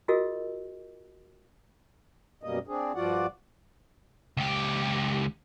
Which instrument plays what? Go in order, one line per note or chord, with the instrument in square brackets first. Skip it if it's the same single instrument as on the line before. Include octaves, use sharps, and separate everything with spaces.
[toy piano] F4 F#4 G#4 A#4 D#5 E6
[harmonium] F#2 B2 G3 A#3 D#5
C4 D4 G#4
G2 F3 F4 F#4 D5 F#5
[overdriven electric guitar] C#2 G4